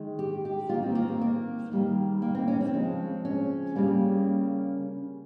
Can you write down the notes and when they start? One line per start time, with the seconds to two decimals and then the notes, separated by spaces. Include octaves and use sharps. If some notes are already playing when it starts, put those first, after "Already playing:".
Already playing: D#3 G#3
0.19 G4
0.45 G4
0.69 D#3 A#3 F4
0.83 C4
0.95 A#3
1.08 C4
1.21 A#3
1.72 D#3 G3 A#3
2.22 A#3
2.35 C4
2.48 C#4
2.61 C4
2.74 C#3 F3 G#3
3.25 C#4
3.75 C#3 G3 A#3